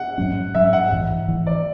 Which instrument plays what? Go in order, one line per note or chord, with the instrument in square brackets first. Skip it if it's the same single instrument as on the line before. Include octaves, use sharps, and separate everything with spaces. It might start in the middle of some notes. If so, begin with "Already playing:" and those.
Already playing: [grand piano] F#5
[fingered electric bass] G#2 F#3 C#4
[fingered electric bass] G#2 F#3 C#4 [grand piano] E5
[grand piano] F#5
[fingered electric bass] A1 G#2 E3
A1 G#2 E3
[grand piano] D5